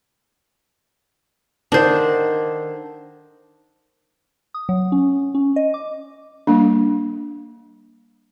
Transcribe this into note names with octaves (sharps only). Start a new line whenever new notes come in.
D3 D#3 D4 C5
D#6
F#3
C#4
C#4
D#5
D6
G3 A#3 D4